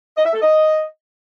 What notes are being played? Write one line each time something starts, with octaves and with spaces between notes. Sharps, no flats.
D#5
E5
A4
D#5